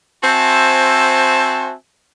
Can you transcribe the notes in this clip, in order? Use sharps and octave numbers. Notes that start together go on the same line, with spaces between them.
C4 F#4 C5 E5 G#5 A5